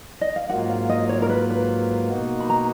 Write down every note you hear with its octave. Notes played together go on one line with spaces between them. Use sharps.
D#5
F5
G#2 F#3 A#3 F4 F#5
F5
D#5
C#5
A#4
B4
B4
B2 A#3 D#4 F#4
B5
A#5